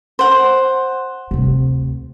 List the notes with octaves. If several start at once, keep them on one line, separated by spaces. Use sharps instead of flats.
C5 F#5
D2 C3